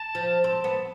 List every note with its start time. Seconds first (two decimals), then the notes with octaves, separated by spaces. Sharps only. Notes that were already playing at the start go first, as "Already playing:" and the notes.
Already playing: A5
0.15 F3
0.44 C4
0.64 B3